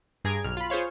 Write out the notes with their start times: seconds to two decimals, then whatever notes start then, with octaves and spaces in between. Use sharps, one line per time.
0.25 G2 G#4 A#5 G#6 D7
0.44 B1 F6
0.57 F4 B5
0.70 F4 G#4 C5 C#5 F5